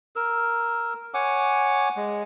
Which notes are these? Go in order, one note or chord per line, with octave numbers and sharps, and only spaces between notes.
A#4 E6
C#5 F#5 G#5 D6
G#3